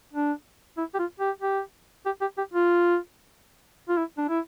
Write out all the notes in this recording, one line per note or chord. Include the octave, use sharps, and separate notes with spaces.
D4
E4
G4
F4
G4
G4
G4
G4
G4
F4
F4
E4
D4
E4